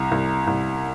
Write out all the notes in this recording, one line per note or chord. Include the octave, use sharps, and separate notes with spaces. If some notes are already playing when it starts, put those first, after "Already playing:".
Already playing: C2 A#5
C2
C2